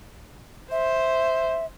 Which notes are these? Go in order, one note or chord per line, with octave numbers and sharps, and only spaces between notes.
C5 E5